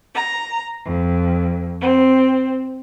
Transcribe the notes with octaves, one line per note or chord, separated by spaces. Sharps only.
A#5
F2
C4